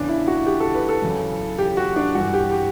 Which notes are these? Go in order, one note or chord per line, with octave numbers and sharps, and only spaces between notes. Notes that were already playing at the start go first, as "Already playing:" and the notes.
Already playing: E2 C#3 E3 D4
E4
F#4
G4
A4
B4
A4
F#2 C#3 E3
G4
F#4
D4
G2 E3 F#4
G4
G4